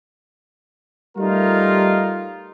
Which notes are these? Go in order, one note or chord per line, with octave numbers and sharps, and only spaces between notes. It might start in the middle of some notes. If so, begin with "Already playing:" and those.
G3 A3 D#4 F4 A#4